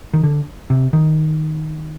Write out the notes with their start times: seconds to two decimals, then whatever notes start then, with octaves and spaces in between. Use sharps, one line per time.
0.13 D#3
0.23 D3
0.70 C3
0.93 D#3